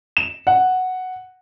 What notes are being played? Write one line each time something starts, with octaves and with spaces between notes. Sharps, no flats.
E7
F#5